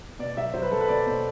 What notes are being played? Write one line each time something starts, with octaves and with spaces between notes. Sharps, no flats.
B2 D5
F#3 E5
F#3 C5
B4
F#3 A4
B4
B2 D5
B2 C5